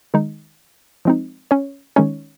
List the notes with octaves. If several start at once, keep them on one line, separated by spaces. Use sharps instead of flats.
D#3 G#3 D#4
F3 G#3 C4 D#4
C#4 C#5
D#3 G#3 C#4 D#4 C#5